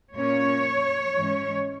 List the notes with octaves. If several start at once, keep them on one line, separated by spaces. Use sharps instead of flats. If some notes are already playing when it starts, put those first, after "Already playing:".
A#2 A#3 C#4 C#5
G#2 E3 G#3 C#4